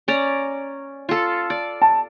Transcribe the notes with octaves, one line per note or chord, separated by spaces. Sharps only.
C#4 D5 A#5
F4 A4
D5
A5